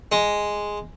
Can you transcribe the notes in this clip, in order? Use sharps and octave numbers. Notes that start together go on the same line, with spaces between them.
G#3